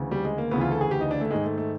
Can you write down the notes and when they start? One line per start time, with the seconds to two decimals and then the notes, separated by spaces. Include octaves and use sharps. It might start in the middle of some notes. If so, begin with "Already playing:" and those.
Already playing: D2 C#3 E3
0.11 G3
0.25 G#3
0.38 A#3
0.51 D2 C#3 E3 B3
0.61 F4
0.71 A4
0.81 G#4
0.91 G4
1.01 D#4
1.11 D4
1.21 A3
1.31 G#2 D#3 G#3
1.44 A3
1.58 A3